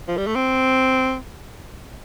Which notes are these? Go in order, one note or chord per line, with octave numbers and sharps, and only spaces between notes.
F3
G3
A3
C4